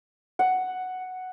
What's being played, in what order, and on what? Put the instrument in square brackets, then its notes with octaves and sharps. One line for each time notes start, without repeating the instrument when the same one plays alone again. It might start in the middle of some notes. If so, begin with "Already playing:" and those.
[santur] F#5